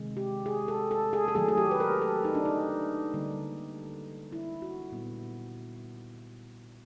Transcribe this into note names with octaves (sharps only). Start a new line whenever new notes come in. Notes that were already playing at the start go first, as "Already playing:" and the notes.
Already playing: C3 D#3 G#3
G4
G#4
A4
A4
G#4
A4
D#3 F#3 A3 G#4
G#4
G4
B4
A#4
A4
D#4
D4
D#4
D3 G3 A#3
E4
F#4
A#2 G3 B3